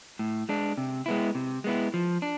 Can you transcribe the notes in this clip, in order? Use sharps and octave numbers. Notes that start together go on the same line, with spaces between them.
A2
G#3 D4
C3
G#3 B3 E4
C3
G#3 B3 E4
F3
D4